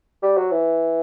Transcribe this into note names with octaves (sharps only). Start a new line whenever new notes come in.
G3
F#3
E3